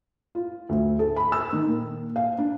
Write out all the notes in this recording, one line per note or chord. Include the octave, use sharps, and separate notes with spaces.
F4
D2
A4
B5
E6
D#3
A#2
F5
D4